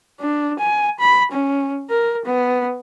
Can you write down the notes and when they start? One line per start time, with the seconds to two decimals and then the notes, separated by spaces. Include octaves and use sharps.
0.20 D4
0.59 G#5
1.00 B5
1.32 C#4
1.90 A#4
2.25 B3